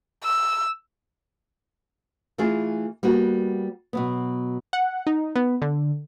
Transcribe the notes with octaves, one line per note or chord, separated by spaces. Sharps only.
E6
E3 A3 F4 G#4
G3 A#3 B3 F#4
B2 F#3 B3
F#5
D#4
B3
D3